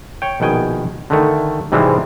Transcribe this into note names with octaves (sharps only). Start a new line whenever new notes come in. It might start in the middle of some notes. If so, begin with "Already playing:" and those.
C#5 G5
A#1 B2 D#3 G5 G#5
D3 D#3 A3
G#2 C3 E3 G3 G#3 C4